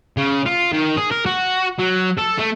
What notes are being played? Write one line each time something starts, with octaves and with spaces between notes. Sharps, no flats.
C#3
F4
D#3
G#4
A#4
F#4
F#3
A4
A3